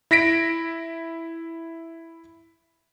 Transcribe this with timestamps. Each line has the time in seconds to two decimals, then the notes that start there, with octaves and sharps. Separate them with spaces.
0.11 E4 A#6 B6 D7